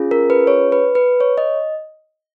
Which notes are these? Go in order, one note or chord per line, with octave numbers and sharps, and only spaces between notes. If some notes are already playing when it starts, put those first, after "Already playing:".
Already playing: C#4 F4 G#4
A#4
B4
C#5
B4
B4
C#5
D#5